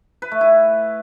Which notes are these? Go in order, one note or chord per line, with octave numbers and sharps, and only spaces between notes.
B4
A3
E4